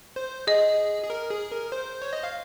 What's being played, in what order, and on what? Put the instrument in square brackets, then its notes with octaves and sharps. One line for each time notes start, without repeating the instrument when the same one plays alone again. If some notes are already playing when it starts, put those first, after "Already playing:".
[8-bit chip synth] C5
[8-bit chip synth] G#4 [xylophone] D#5
[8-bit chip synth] G#4
A#4
G#4
A#4
C5
C#5
D#5
F5